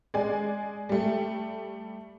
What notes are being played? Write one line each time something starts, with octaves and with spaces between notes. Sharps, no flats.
G#3 D5 G#5
G3 A3